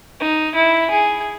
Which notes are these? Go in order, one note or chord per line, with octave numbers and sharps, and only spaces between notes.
D#4
E4
G#4